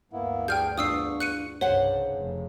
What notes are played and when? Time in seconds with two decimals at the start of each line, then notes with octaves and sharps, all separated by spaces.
0.13 D2 G2 A#3 B3 E4
0.48 D4 G#4 G5 F6 G6
0.78 E2 D4 F4 C#6 D#6 E6 C7
1.20 F#6 C#7 D#7
1.61 C2 G2 C#3 C5 C#5 F#5
2.16 F1